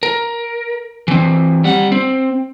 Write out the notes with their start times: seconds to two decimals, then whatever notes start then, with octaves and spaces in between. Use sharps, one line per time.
0.03 A#4
1.08 E3 C4
1.64 G3 F#5
1.92 C4